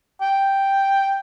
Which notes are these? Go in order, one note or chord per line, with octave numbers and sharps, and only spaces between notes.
G5